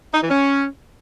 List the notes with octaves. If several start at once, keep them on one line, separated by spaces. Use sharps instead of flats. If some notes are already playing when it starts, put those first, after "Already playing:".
D#4
E3
C#4